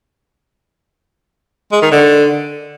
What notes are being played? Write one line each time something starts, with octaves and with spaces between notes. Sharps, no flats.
G#3
D#3
D3